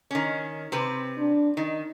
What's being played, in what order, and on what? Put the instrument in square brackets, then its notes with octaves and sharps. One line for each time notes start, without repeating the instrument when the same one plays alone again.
[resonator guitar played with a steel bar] D#3 C#4
C3 C4 B4
[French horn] D4
[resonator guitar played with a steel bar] D#3 [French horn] D#4